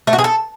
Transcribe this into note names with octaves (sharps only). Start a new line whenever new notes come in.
A3
F#4
G#4
A4